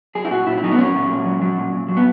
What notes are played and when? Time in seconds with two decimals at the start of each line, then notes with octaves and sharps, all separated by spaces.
0.15 F#3 G#4
0.25 E4
0.31 A#2 F#4
0.47 A#2 E4
0.57 E4
0.63 F#3 D#4
0.72 B3
0.78 F#3 C#4
0.95 A#2
1.10 A#2
1.25 F#3
1.42 F#3
1.58 A#2
1.73 A#2
1.88 F#3
1.97 B3